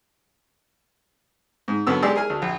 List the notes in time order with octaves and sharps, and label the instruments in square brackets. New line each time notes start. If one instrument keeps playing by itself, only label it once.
[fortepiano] G#2
F#2 D3 B3 E6
G#3 G4 G#4 D5 E6
G#4 A#4 G#5
D2
A#1